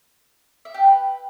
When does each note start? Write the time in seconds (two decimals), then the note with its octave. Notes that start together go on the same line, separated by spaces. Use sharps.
0.65 E5
0.74 G4
0.84 B4